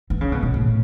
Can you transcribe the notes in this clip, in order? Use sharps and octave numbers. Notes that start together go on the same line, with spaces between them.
E3
C#3
B2
B2
A2